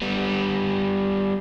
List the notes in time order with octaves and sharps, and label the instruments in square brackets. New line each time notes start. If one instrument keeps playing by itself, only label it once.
[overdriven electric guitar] G3 B3